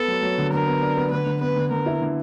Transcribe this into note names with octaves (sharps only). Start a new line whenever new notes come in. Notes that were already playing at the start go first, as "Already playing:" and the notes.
Already playing: B3 A4
F#3
F#3
D3
D3 A#4
B3
D4
B3
D3 B4
D3
B3 B4
D3
D3 A#4
E4
D3